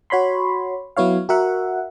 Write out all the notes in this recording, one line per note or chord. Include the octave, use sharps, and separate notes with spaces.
F#4 C#5 B5 C6
F#3 B3 E4 C#5 F5
F#4 A#4 E5 F#5